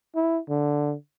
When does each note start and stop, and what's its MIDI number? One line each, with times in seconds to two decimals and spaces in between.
0.16 0.39 64
0.49 0.94 50